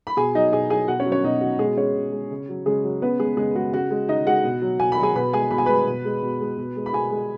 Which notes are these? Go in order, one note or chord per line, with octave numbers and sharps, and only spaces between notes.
B5
B2 G#4 G#5
F#3 D#4 D#5
B2 G#4 G#5
F#3 G#4 G#5
B2 F#4 F#5
C#4 C#5
F#3
C#4 C#5
B2 D#4
F#3 F#4
B2 G#3 G#4
G#3 C#4 C#5
B2
G#3
C#3
F#3
C#3 G#3 G#4
F#3
C#3 B3 B4
G#3 G#4
C#3 G#3 G#4
G#3 F#4
C#3 F#4
G#3
C#3 D#4 D#5
G#3 F#4 F#5
B2
F#3
B2 G#5
B5
F#3
G#4 G#5
B2 B4 B5
G#3 G#4 G#5
B2 B5
G#5
G#3 B4 B5
B2
G#3
B2
G#3
B2
G#3
B5
B2 G#4 G#5
G#3